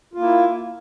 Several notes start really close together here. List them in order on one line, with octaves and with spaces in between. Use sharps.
F4 A#3 E4